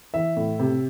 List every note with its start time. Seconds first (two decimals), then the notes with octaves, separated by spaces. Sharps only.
0.14 E3 E5
0.36 A2
0.59 C3